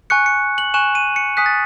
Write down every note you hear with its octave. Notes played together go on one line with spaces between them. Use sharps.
G#5 C#6 F#6 C#7
C#7
F#7
G#5 C#6 F#6 E7
D#7
C#7
G#5 D#6 F#6 B6
A6